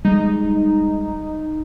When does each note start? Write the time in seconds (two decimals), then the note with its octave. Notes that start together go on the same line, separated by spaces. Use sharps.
0.05 G3 G#3 D#4